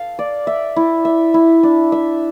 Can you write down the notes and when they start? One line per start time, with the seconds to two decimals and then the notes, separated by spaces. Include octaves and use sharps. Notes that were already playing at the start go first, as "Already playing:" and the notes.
Already playing: A4 F5
0.19 D5
0.47 E5
0.76 E4
1.05 E5
1.34 E4
1.63 D4
1.92 E5